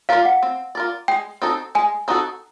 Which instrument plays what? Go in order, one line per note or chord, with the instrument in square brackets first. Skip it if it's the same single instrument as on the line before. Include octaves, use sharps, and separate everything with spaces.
[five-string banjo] F4 A#4 D5 [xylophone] F5
[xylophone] F#5
[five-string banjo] C4
F4 A#4 D5
[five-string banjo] G#3 [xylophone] G5
[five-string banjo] C4 D#4 F#4 A4
[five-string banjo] G#3 [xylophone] G#5
[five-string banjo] C4 D#4 F#4 A4